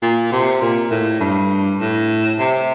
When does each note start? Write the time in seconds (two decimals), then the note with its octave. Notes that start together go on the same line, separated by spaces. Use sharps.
0.02 A#2
0.32 C3
0.61 A#2
0.91 A2
1.20 G2
1.79 A2
2.38 C3